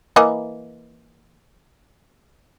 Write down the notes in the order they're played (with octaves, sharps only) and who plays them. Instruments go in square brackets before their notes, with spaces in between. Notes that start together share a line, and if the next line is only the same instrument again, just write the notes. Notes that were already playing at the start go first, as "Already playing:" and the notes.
[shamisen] E3 A#3 D#5